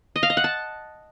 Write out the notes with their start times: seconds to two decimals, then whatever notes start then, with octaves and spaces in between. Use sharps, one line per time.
0.16 D#5
0.23 F5
0.30 D#5
0.37 F#5
0.44 A5